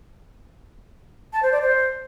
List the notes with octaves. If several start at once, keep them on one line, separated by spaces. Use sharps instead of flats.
A5
C5
D5
C5